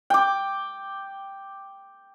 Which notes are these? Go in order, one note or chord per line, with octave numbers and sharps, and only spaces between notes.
G5 D6